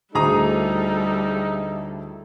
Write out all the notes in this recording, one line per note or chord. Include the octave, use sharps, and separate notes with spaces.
D2 A2 G3 D#4 G#4 A4 A#5 D#6